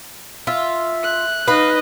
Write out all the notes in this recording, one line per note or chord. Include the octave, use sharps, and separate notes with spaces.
F4 E5
F#6
D#4 B4 D#5 F5